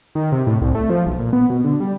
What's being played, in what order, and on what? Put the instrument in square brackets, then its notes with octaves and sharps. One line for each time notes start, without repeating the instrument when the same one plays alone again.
[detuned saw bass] D#3
C3
A2
C2
A3
F3
B1
A#2
B3
B2
D3
G3